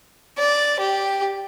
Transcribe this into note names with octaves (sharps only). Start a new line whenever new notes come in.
D5
G4